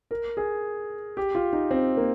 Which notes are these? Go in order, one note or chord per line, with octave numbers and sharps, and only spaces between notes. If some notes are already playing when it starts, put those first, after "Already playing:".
A#4
G#4
G4
F4
D#4
C4
A#3